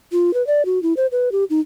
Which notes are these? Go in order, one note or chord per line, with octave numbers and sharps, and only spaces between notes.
F4
B4
D5
F#4
E4
C5
B4
G4
D#4